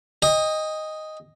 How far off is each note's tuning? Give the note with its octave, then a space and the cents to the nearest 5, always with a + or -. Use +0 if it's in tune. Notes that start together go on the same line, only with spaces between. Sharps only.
D#5 +0 G5 +45